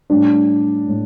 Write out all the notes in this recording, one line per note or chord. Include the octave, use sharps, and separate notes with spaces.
A2 G3 D4
A2